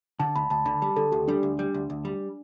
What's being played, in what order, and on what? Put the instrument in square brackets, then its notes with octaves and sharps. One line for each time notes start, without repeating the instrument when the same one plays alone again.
[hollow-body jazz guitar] D3 [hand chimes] A5
[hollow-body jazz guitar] D2 [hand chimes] B5
[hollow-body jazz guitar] D2 [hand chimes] A5
[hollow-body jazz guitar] D3 [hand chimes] B5
[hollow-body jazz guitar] G3 [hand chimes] A5
[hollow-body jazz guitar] D3 [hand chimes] A4
[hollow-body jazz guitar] D2 [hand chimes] G4
[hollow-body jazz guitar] G3 [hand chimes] D4
[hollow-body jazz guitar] D2
G3
D2
D2
G3